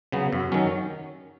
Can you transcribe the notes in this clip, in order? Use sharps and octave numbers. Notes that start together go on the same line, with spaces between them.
C#3 F#3 B3
F#2
D#3 F#3 C#4